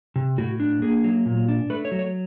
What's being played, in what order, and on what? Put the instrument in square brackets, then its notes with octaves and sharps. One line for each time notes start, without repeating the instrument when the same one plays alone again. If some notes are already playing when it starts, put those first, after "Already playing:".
[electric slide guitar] C3
A2 F#4
D4
A#3 G#4
F#3
A#2
D4
A3 B4
C#5
F#3
C#5